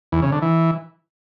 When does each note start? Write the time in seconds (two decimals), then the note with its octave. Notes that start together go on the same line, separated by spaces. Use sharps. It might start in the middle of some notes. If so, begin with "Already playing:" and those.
0.12 E2
0.22 C#3
0.32 D3
0.42 E3